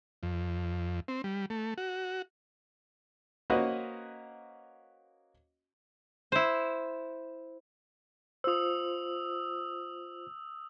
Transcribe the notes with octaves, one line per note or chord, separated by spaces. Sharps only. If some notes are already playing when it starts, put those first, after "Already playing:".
F2
C4
G3
A3
F#4
A#3 C#4 F#4 B4 C5 D#5
E4 C5
F4 C5 D#6 E6